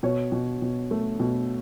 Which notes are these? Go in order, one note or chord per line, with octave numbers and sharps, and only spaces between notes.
B2 C#5
B2
B2
A3
B2